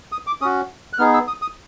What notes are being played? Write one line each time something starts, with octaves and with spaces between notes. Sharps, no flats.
D#6
D6
C#4 F#4 D#6
F#6
B3 D#4 G#4 F6
E6
D#6
D#6